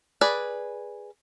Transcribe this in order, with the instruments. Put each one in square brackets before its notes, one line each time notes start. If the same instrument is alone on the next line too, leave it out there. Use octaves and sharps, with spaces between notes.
[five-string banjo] G#4 B4 D5